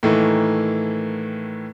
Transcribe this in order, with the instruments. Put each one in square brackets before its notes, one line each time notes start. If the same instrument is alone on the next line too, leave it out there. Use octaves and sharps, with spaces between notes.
[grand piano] A2 D#3 E3 A3 A#3